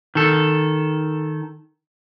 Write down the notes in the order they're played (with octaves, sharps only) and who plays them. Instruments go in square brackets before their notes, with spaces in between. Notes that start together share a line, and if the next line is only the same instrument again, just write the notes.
[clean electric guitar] D#3 A4